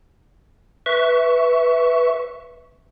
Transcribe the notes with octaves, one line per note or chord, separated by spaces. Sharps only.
B4 E5 C#6